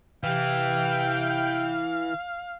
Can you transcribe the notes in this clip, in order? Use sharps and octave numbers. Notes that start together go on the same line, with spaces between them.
C3 E3 F5 G5